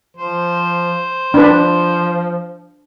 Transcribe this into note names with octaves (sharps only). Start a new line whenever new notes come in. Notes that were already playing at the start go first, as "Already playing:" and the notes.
F3 C5
F3 D4 B4